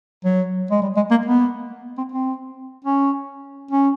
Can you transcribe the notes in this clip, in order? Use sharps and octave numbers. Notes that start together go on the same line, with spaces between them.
F#3
G#3
G3
G#3
A#3
B3
C4
C4
C#4
C#4